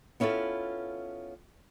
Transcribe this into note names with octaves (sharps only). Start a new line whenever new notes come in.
B3 C#4 E4 F4 A4